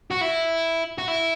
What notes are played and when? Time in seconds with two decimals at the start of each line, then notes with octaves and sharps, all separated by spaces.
0.11 F#4
0.21 E4
0.98 F#4
1.08 E4